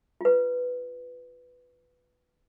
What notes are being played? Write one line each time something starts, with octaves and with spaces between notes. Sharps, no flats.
F4 B4